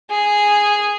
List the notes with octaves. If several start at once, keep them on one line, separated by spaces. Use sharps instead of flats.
G#4